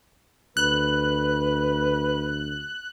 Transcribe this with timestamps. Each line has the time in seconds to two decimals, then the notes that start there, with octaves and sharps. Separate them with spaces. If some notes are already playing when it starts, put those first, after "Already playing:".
0.57 D2 B4 F#6